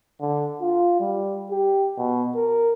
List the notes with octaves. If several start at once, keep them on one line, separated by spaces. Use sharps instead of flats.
D3
F4
G3
G4
B2
A#4